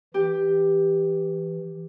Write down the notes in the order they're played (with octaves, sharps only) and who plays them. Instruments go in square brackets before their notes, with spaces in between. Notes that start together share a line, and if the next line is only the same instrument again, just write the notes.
[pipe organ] E3 [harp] G4